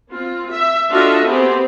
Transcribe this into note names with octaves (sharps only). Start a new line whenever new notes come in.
C4 F4
E5
D4 F4 F#4 A4 D#5 E5
B3 C4 G4 G#4 C5